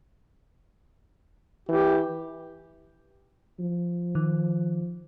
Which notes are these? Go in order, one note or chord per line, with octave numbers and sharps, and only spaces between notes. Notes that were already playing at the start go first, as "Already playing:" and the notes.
E3 G4
F3
D#3